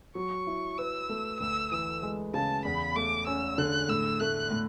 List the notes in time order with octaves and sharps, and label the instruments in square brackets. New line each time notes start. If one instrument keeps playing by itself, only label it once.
[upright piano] F#3 [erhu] C#6
[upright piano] E4
[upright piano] B4 [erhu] E6
[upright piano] A3
[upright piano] D2 [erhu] E6
[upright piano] E3 [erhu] E6
[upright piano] G#3
[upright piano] C#3 [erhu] A5
[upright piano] E2 [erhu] B5
[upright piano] A3 [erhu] D6
[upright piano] C#4 [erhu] E6
[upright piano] D3 [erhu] F#6
[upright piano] A2 [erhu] E6
[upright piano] A3 [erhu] F#6
[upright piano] A2